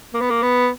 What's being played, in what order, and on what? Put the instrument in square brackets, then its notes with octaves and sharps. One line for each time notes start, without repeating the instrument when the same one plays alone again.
[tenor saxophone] A#3
B3
A#3
B3